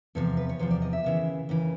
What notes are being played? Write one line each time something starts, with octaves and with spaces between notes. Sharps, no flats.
E2 C3 F3 A4
B4
C#5
E2 C3 F3 C5
D5
D#5
E5
D#2 C#3 E3
D#2 C#3 E3